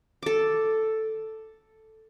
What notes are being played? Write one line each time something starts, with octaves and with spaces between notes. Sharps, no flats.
A4 D6